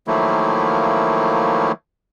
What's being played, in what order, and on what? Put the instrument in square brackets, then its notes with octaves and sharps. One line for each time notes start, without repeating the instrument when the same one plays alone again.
[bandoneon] D#3 F3 F#3 A3 A#3 E4